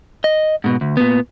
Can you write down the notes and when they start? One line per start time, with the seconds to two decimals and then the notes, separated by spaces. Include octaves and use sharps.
0.24 D#5
0.64 G#2 B2
0.81 D2
0.97 A#2 B3